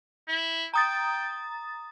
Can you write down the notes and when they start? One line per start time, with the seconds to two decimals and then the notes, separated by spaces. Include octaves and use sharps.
0.28 E4
0.74 G5 A#5 D#6 A6